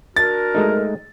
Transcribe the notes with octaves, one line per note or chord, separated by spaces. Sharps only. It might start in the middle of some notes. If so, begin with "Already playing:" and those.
D4 F#4 A#4 A6
G#3 A3 D#4